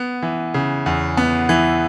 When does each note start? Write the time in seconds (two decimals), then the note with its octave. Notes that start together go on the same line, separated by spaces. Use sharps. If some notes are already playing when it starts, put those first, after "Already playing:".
Already playing: B3
0.22 E3
0.54 C#3
0.86 E2
1.17 B3
1.49 E3